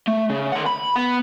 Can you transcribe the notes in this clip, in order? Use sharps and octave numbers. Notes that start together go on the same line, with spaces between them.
A3
C#3
D#3 F#5
B5
B3